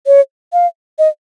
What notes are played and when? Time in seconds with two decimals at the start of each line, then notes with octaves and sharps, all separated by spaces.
0.07 C#5
0.53 F5
0.99 D#5